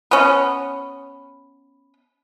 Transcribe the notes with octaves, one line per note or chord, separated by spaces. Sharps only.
B3 C#4